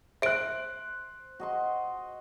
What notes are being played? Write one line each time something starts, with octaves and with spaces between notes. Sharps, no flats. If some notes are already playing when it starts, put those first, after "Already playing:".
C5 E5 F#6 D7
F#4 D#5 C6